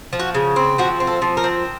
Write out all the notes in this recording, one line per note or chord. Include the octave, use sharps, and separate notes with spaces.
F3
F#4
C#3
C4
F3 F#4
C4
A4
F3
A#4
C4